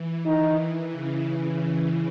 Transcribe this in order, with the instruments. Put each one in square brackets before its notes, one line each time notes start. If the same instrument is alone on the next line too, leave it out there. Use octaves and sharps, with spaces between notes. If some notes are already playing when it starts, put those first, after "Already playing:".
Already playing: [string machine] E3
[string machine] D#3 [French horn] D#4
[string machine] E3
C#3